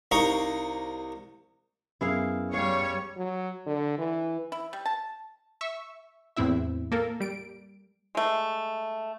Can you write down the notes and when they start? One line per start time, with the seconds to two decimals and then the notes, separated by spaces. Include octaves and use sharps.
0.11 C2 D#4 A#4 F5 C#6
2.01 F#2 B3 E4 G#4 F5
2.53 G3 C#5 F5
3.17 F#3
3.67 D3
3.98 E3
4.52 E4
4.73 G3
4.85 A5
5.61 E5 C#6 E6
6.36 E2 A2 C4 E4 E5
6.92 A#3 A4 A#4
7.20 G3 D7
8.15 G#3 A3